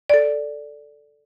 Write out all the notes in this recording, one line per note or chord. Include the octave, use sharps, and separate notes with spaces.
A4 D5